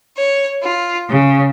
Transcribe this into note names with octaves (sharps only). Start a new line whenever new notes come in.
C#5
F4
C#3